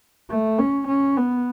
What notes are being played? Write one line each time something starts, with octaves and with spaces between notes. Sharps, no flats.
A3
C#4
C#4
B3